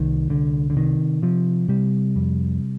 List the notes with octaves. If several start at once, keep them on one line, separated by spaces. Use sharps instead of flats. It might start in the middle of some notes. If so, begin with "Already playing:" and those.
Already playing: C2 D#3
C2 D3
D3
C3 D#3
C3 F3
C3 G3
F2